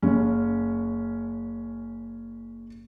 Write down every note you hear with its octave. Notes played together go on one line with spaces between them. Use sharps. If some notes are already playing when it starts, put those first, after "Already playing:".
F#1 C#4